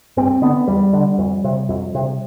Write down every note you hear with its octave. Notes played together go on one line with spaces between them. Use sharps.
G2 C4
D3 B3
E2 G3
D3
F2
C3
F2
C3